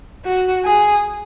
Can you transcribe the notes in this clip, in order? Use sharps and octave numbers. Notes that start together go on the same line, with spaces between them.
F#4
G#4